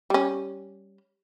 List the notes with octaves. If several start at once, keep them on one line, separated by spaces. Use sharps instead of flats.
G3 C#4